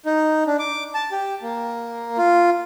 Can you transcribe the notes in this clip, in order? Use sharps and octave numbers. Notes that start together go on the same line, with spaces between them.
D#4
D4
D6
A5
G4
A#3
F4